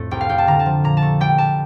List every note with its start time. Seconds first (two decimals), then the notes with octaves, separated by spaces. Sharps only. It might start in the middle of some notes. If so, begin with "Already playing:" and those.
Already playing: F2 A2 A3
0.11 C2 G5
0.21 F5
0.29 C2 G5
0.38 A5
0.47 D3 A#5
0.59 A5
0.66 F3
0.84 A#2 A#5
0.97 A5
1.02 A3
1.20 G3 G5
1.38 G3 A5